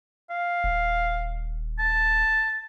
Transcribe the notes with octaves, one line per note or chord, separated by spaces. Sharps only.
F5
D#1
A5